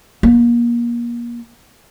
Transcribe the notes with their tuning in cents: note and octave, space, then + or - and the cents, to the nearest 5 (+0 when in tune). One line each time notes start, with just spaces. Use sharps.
A#3 +30